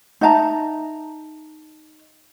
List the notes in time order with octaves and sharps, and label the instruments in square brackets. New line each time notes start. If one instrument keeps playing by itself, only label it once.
[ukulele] D#4 E5 A5 A#5